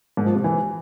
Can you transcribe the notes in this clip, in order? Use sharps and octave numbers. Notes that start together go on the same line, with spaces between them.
G#2
F3
C3
E3